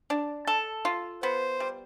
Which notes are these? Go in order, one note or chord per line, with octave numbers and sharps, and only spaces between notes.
D4
A4
F4
B3 C5
G3